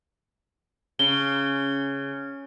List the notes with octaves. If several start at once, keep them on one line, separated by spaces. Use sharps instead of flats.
C#3 G7